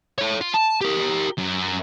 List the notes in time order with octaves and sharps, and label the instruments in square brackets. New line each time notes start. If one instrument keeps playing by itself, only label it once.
[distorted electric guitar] A4 C#5
F4
A5
G4 A#4
F#2